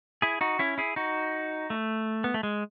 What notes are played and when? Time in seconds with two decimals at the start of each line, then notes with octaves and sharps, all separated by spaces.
0.22 E4 G#4
0.41 D#4 F#4
0.59 C#4 E4
0.78 E4 G#4
0.96 D#4 F#4
1.70 A3
2.24 B3
2.34 A3
2.43 G#3